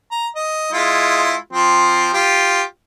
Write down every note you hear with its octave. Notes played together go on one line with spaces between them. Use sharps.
A#5
D#5
G#3 E4 F4
F3 C4
F4 G4